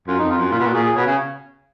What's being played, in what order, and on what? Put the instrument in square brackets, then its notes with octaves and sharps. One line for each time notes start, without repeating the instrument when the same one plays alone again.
[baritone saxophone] F#2 [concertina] F4
[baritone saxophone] F2 [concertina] D#4
[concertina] F4
[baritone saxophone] F#2
[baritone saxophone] A#2 [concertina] F4
[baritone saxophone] B2
[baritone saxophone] A#2 [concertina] F#4
[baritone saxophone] A#2 [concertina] G#4
[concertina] G#4
[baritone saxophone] B2 [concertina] C#5
[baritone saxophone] C#3